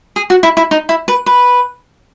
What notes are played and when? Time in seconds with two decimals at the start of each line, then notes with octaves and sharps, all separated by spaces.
0.16 G#4
0.30 F#4
0.43 E4
0.57 E4
0.71 D#4
0.89 E4
1.08 B4
1.26 B4